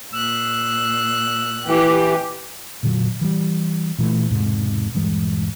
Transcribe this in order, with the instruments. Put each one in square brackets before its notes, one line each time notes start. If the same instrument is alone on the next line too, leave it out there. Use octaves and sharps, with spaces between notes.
[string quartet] A#2 F#6 [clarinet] E6
[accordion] E3 [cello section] G4
[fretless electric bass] F1 A#2 D3 F#3
E3 G3
A#2 E3 F#3 A3
E1 G#2 C3
D#1 G2 E3 G#3